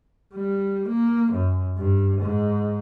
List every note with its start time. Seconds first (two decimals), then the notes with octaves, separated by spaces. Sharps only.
0.34 G3
0.88 A#3
1.33 F#2
1.78 G2
2.21 G#2